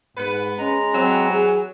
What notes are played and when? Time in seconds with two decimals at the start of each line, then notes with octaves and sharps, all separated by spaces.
0.17 G#2 B3 B4
0.58 G#3 C#4 A#5
0.94 E3 F#3 C4
1.30 G#4